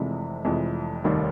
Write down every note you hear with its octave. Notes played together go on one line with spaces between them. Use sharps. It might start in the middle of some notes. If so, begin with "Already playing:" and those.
Already playing: F1 F2 C3 E3 G#3
F1 F2 C3 E3 G#3
F1 D#2 D#3 G3